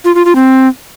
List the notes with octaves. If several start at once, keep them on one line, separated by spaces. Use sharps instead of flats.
F4
F4
F4
C4